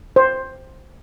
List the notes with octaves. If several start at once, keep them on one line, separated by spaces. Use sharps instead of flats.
C5